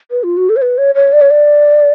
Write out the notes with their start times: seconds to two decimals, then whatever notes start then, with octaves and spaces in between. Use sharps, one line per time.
0.11 B4
0.23 F4
0.37 F#4
0.49 A4
0.56 C#5
0.62 B4
0.78 C#5
0.95 C#5
1.12 D5
1.21 C#5
1.30 D5